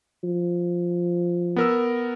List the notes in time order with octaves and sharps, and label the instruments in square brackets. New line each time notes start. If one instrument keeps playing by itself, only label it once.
[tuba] F3
[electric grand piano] B3 A#4 E6